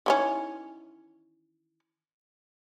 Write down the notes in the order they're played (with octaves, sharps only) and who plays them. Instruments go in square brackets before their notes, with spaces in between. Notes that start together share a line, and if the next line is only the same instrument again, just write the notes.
[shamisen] D#3 E3 C#4